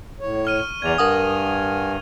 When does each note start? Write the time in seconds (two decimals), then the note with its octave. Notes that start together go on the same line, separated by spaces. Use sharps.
0.20 A2 C#5
0.45 C#6 F6 D#7
0.82 E2 D5 G#6 F7
0.98 G2 A#4 F#5 G#5 D#6